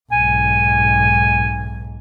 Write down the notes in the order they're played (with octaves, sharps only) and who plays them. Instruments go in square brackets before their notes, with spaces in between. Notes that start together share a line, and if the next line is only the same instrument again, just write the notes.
[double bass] B1 G#2 [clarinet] G#5